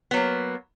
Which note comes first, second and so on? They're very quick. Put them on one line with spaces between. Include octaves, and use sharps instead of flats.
B3 F#3 A#3